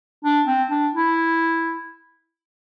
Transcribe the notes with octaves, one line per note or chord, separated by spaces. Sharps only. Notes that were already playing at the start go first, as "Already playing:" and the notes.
D4
C4
D4
E4